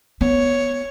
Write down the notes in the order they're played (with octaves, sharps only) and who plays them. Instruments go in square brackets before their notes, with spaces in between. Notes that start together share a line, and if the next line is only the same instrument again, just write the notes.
[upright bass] B3 [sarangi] C#5